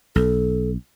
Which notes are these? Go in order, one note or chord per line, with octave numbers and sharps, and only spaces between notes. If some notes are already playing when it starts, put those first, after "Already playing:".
B1 A4